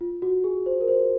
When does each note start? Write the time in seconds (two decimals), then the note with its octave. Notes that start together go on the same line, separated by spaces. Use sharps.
0.01 F4
0.22 F#4
0.44 G#4
0.66 C5
0.81 A#4
0.88 C5